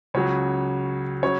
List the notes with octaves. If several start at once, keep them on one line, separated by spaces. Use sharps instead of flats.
C#2 C#3 F#3 C#5
C#3 F#3 C#5